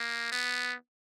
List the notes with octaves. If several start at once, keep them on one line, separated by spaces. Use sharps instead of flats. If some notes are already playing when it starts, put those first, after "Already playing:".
Already playing: A#3
B3